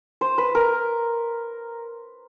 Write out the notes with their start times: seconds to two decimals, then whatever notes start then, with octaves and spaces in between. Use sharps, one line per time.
0.21 C5
0.38 B4
0.55 A#4